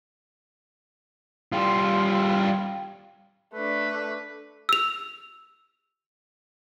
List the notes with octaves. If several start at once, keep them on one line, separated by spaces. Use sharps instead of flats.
G3 F4
A3 D4 B4
E6 F7